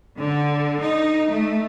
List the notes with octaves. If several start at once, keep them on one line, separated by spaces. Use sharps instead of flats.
D3
D#4
A3